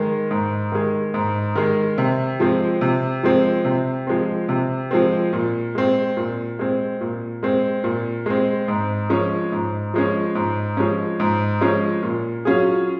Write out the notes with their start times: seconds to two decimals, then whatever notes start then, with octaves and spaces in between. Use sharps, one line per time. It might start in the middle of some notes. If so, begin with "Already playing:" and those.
Already playing: D#3 G#3
0.31 G#2
0.72 D#3 G#3
1.14 G#2
1.55 D#3 G#3
1.98 C3
2.40 F3 G#3 C4
2.81 C3
3.23 F3 G#3 C4
3.65 C3
4.07 F3 G#3 C4
4.49 C3
4.91 F3 G#3 C4
5.33 A#2
5.75 G#3 C4
6.17 A#2
6.59 G#3 C4
7.01 A#2
7.43 G#3 C4
7.84 A#2
8.26 G#3 C4
8.68 G#2
9.10 F3 G#3 C#4
9.52 G#2
9.94 F3 G#3 C#4
10.35 G#2
10.77 F3 G#3 C#4
11.20 G#2
11.61 F3 G#3 C#4
12.02 A#2
12.45 F#3 C#4 F4 G#4